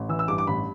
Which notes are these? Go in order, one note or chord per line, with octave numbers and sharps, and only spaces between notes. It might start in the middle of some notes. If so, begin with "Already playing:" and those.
Already playing: A1
E3 E6
E6
G2 D6
D6
A1 B5